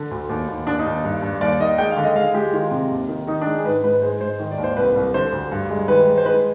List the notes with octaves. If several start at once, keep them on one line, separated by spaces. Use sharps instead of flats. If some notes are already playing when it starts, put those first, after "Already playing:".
Already playing: D3
D2
D#2
D#2
D#2 D4
D#4
D#2
G2
G2
D#2 D5
D#3 D#5
G#3 G5
F5
D3
D#5
G#3 F5
G#3 G4
D#3 F4
C3
D#2
D#3
D#3 D#4
D4
G#3 D#4
G#4
G#2 B4
G#2 B4
G#3 C5
G#2 C5
D#3
D5
D#2
C5
C2 B4
C2
D3 C5
D2
G2
G#3
D#3 B4
G#3
C5
G#3 B4